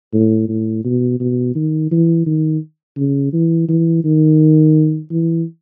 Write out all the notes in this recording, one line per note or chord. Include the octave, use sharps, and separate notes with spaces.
A2
A2
B2
B2
D#3
E3
D#3
C#3
E3
E3
D#3
E3